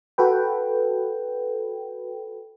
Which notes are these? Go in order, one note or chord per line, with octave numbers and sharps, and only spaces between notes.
F#4 A4 B4 G5